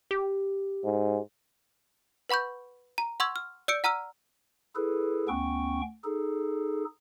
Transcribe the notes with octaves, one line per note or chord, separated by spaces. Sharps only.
G4
G#2
B4 F#5 B5 C#6 G6
A#5
F#5 C6 C#6 E6 G#6
F6
D5 E6 G6 C#7 D7
F#5 A#5 E6 F6 D#7
E4 G#4 A4 B4
D2 B3 C#4 G5 C#6
D#4 G#4 A4